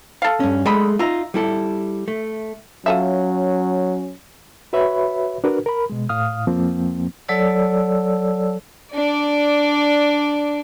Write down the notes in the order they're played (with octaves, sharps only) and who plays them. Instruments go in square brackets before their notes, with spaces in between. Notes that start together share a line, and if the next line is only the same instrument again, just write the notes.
[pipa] A4 F5
[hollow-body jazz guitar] G2 C#4
[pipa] D3 D#5 B5 [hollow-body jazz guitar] G#3 A3
[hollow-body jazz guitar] D#4 F4 [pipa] E5 A#5
[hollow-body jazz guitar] G3 E4 A4
A3
[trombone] F#3 [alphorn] C#4 [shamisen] F4 A4 E5
[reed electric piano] F#4 B4 C#5 E5 B5
D4 F#4 A#4 B4
A#4 B5
B2 G#3
A2 F5 D#6 F6
F2 F3 A#3 C4
[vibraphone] F#3 A4 C#5 D5 A5 E6
[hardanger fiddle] D4 D5